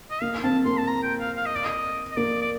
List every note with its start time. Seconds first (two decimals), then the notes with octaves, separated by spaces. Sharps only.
0.10 D#5
0.21 A#3 F5
0.43 C4 A5
0.65 A#3 C6
0.78 A5
0.87 A#5
1.03 G5
1.20 F5
1.36 F5
1.46 D#5
1.55 D5
1.64 D#5
2.11 D#5
2.16 A#3 D5
2.41 D5